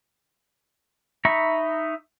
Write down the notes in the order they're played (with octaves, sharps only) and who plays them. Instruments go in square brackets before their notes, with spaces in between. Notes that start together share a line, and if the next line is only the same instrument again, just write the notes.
[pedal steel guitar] D#4 E5 A#5 B5 C#6